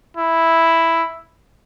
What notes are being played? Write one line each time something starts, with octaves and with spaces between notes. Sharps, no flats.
E4